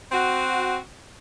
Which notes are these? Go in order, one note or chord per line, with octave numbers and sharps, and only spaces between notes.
C4 F#4